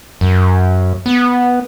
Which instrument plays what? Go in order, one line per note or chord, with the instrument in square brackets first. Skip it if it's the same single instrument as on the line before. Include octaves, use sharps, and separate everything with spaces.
[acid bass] F#2
B3